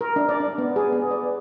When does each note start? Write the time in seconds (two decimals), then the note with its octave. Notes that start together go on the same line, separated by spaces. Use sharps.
0.01 A#4
0.16 D4
0.29 D5
0.40 D4
0.58 B3
0.76 G#4
0.92 B3
1.11 D5